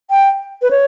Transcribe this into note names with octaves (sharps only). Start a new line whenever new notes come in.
G5
B4
C#5